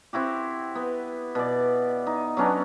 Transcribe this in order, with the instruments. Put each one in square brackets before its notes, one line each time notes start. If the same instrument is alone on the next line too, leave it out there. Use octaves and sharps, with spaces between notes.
[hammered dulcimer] C4 E4 F#4 G4
B3
B2 D5
D#4
F#3 B3 C#4 D4